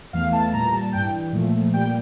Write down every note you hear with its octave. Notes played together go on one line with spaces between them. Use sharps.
E2 E3 A3 F5
A5
A#2 G3 A#5
A5
G2 E3 G3 G5
A#2 F3 A3
A#2 G3 G5